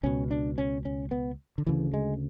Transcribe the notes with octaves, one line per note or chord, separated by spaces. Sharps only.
C#2 B2 C#4
D4
C#4
C#4
B3
D3
D2 C#3 E3
G#3